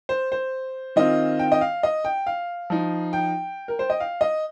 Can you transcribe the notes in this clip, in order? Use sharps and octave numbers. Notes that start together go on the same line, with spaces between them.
C5
C5
D#3 C4 F4 D#5
G5
D#5
F5
D#5
G5
F5
F3 D#4
G5
A#4
C5
D#5
F5
D#5